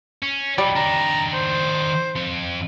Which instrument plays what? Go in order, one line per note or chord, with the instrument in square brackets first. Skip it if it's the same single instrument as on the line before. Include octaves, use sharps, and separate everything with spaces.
[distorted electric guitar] C#4
[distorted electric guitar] F#3 D#4 [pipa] G3
[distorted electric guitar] D#3 D4 [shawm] A#5
[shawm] C5
[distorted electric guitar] F2